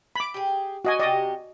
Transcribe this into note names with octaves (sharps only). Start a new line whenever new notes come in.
B5 D6
G4 G#4
F#4 D5 D#5 G#5
C3 F#4 G4 D5 D#5